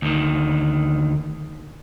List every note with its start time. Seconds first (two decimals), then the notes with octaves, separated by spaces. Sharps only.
0.02 D2 D#3